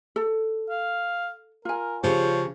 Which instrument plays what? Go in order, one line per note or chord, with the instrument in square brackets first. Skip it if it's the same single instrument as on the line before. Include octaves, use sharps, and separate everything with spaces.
[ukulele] A4
[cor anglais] F5
[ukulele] F4 G#5 [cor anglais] A#4
[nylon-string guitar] C#3 G4 [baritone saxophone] F3 [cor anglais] C#5